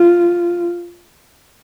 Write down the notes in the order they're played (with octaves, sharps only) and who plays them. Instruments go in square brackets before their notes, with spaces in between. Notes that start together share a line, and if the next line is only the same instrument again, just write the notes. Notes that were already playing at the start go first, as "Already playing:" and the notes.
Already playing: [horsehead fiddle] F4